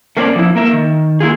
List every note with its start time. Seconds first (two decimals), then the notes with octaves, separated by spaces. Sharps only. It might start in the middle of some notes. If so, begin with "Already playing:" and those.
0.17 A3 A#3 C4 C#4 A#4 D5
0.36 F3 E4
0.56 A#3 A#4 E5
0.73 D#3
1.20 A#3 E4 F4 G#4